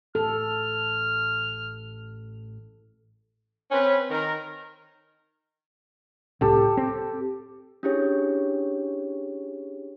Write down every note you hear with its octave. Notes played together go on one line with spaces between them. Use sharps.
A1 A4 F6
C4 C#4 B4
D#3 A#4
C2 A2 G4 A4 A5
C4
C#4 D4 E4 G4 G#4 C#5